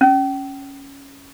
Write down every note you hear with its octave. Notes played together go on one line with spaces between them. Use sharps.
C#4